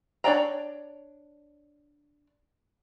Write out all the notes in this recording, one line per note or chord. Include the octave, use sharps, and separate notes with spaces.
D4 C#5 D5 G5 A#5